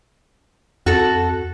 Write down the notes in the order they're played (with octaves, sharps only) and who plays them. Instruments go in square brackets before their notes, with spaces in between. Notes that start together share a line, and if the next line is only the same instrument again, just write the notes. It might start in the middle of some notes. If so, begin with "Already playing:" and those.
[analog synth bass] F2 [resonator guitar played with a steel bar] F#4 A4